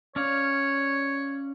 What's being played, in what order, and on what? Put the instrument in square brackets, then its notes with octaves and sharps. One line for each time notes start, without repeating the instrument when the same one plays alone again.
[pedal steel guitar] C#4 D5 F5 [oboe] C#5